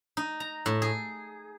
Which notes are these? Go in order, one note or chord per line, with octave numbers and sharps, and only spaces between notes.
D#4
A#5
A2
G#4